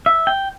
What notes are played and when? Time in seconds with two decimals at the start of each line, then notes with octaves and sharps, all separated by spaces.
0.06 E5
0.27 G5